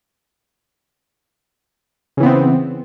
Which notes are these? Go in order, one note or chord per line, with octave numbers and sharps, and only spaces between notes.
C#3 E3 B3 C4